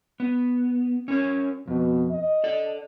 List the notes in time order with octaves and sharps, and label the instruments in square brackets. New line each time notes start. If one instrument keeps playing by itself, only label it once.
[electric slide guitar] B3
C#4 A#4 C#5
[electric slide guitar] F2 [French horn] B2
[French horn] D#5
[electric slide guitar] A4 D5